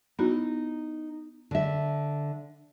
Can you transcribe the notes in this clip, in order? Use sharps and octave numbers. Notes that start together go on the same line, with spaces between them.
B3 D#4 E4 F#4
D3 E5